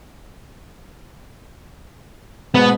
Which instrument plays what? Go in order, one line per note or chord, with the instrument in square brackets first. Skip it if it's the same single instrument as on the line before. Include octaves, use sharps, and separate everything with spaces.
[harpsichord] G#2 B2 [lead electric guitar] B3